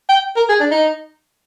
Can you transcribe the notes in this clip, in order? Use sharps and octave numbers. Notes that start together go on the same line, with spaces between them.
G5
A#4
G#4
D4
D#4